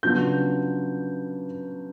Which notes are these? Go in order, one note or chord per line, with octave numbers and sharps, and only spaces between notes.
C#3 F#3 B3 D4 F4 G6